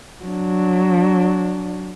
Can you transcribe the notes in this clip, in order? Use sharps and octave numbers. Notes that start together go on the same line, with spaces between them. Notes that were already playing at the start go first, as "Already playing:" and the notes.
F#3 D4